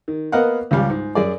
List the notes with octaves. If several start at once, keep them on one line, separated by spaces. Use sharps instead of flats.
D#3
A#3 B3 A#4 D#5 F5 F#5
C#2 C#3 G3 F5
G#2
F#2 G#4 D5